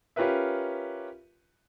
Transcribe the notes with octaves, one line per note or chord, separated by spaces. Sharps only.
C#4 F4 G4 A#4 B4 E5